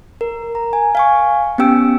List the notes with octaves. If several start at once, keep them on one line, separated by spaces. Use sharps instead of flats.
A#4
A#5
G#5
F5 G#5 C#6
B3 C#4 G4 G5 E6 D7